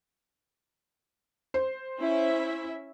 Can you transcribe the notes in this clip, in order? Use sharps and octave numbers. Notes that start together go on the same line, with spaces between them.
C5
C#4 E4 E5